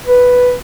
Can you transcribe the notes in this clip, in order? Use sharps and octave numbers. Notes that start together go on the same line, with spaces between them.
B4